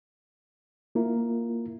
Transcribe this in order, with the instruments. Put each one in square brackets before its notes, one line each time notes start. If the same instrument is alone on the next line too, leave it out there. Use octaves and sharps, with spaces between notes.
[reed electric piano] A#3 E4 F4 A#4